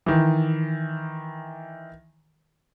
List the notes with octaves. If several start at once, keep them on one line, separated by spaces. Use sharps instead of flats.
D#3 E3